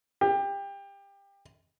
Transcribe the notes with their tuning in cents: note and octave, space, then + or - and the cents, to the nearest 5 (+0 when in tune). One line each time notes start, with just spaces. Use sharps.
G4 +25